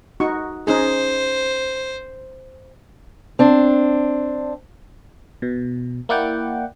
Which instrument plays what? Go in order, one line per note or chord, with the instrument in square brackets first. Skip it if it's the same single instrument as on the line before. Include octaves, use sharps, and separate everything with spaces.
[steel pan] D#4 F#4 C#6
[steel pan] C#4 D#4 G#4 [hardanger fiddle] C5
[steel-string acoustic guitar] C4 D4
[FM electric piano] B2
A#3 E4 D5 F#5 G5